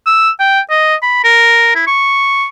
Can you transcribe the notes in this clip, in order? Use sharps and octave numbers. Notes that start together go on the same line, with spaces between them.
E6
G5
D#5
B5
A#4
E4
C#6